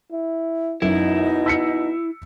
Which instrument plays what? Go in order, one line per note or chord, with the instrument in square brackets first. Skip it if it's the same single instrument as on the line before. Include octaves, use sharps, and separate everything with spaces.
[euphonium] E4
[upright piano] F#2 [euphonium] B2 [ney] D#4 [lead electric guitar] E4
[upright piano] E6 B6 C#7